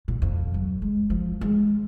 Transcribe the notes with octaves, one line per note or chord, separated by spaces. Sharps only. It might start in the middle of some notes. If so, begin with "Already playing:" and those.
A#2
F2
F#3
G#3
F3
G#3